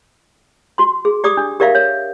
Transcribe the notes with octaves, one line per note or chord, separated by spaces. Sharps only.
F#4 C6
G#4
G4 D5 D6 D#6
D4
G4 A#4 D5 E5 F5
C#5